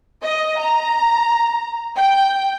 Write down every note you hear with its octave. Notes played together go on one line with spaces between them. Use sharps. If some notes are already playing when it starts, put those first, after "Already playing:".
D#5
A#5
G5